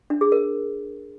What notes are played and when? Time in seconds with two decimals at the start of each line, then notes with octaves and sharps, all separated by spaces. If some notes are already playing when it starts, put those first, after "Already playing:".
0.10 D4
0.21 G#4
0.32 A#4